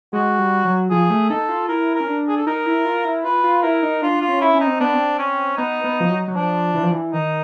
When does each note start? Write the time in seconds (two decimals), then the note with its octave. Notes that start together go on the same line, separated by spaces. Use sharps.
0.13 G#3 F#4
0.39 G3
0.65 F#3
0.90 F3 G#4
1.10 A3
1.29 D#4 A4
1.49 F4
1.69 E4 A#4
1.95 A#4
2.00 C#4
2.08 D4
2.28 G#4
2.37 A4
2.47 D#4 A#4
2.66 E4
2.85 F4
3.05 E4
3.24 F4 B4
3.44 F4
3.63 E4 A#4
3.83 D#4
4.02 D4 F4
4.22 F4
4.29 C#4
4.41 E4
4.54 C#4
4.60 D#4
4.67 C4
4.80 B3 D4
4.93 C4
5.19 C#4
5.57 B3 D#4
5.84 B3
6.00 F3
6.09 F#3
6.28 F#3
6.36 F3 D4
6.74 E3
6.83 F3
6.91 E3
7.13 D#3 D#4